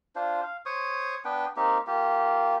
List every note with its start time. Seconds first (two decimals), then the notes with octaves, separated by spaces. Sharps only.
0.16 D4 F4 C5
0.43 F5
0.66 C5 C#5 C#6 D#6
1.25 B3 D4 B4 G5
1.57 A#3 C4 D#4 G4
1.87 A#3 F4 G4